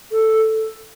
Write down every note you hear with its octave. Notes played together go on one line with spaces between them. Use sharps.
A4